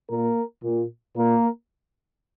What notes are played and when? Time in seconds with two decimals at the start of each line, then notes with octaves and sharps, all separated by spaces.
0.09 A#2 A#3 A#4
0.63 A#2
1.16 A#2 A#3 A#4